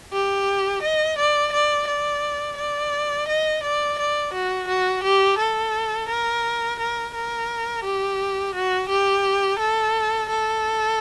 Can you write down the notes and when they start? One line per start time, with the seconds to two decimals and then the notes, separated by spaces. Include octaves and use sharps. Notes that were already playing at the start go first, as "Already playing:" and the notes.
0.12 G4
0.83 D#5
1.18 D5
1.53 D5
1.87 D5
2.57 D5
3.28 D#5
3.63 D5
3.99 D5
4.33 F#4
4.68 F#4
5.04 G4
5.38 A4
6.09 A#4
6.80 A#4
7.14 A#4
7.84 G4
8.55 F#4
8.89 G4
9.59 A4
10.29 A4